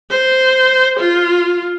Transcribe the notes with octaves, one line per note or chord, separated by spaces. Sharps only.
C5
F4